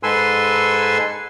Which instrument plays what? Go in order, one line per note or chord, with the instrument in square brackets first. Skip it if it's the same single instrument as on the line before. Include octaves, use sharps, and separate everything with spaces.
[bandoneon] G#2 A4 B4 G#5 C6 E6